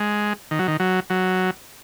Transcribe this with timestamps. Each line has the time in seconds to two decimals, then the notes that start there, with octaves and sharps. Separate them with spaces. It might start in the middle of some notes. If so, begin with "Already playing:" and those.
Already playing: G#3
0.51 D#3
0.59 F#3
0.68 D#3
0.80 F#3
1.10 F#3